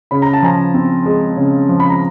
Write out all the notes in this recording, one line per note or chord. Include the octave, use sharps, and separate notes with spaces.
C#3 B5
A#5
A5
F3 G#5 A#5
C4
G#3
C#3
F3
B5
A#5